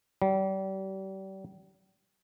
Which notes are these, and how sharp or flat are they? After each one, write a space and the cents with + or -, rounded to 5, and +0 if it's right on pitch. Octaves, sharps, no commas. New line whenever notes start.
G3 -35